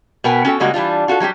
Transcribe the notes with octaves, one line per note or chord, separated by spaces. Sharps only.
B2 B3 A#4 G5 G#5
C#4 F#4 A4 G5
C#3 G3 G#3 A#3 F#4
E3 G3 D4 F4
F4 F#4 G#4 A4
F#3 G3 F4 G4